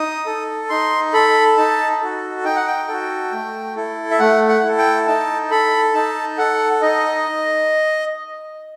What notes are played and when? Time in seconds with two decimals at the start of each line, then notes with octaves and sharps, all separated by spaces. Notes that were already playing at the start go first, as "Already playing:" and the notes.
Already playing: D#4 D#6
0.26 A4
0.70 D#4 C6
1.13 A4 B5
1.57 D#4 A5
2.01 F#4 A4
2.44 D#4 G5
2.56 F#5
2.67 G5
2.88 F#4 A4
3.32 A3
3.76 E4 A4
4.11 E5
4.19 A3 F#5
4.48 F#5
4.63 E4 A4
4.78 G5
5.07 D#4 A5
5.51 A4 B5
5.94 D#4 A5
6.38 A4 F#5
6.82 D#4 D#5